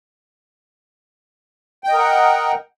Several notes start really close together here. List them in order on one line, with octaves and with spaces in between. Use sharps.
G5 D#5 A#4 F#5